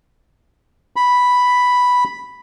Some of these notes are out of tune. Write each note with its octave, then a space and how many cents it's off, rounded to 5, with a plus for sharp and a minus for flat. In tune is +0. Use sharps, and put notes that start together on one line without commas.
B5 +0